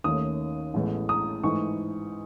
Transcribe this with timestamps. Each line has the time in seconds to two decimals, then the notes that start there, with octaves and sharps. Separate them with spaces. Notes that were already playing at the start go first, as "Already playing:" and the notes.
0.04 D#2 D#3 A3 C#4 D#6
0.74 A1 A2 G#3 B3
1.09 D#6
1.43 G#2 E3 A3 C#6